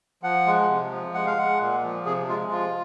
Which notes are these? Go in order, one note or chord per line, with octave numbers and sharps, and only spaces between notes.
F3 F#5
G#3
C3
F3
G#3 F#5
F5
G#3 F#5
A#2
F3
C3 G#4
G#3 F4
F3 F4